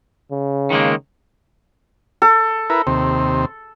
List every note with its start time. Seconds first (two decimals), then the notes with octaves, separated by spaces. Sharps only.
0.31 C#3
0.70 D#3 G#3 A#3
2.22 A4
2.70 E4 A#4 B4
2.87 D#2 C3 C4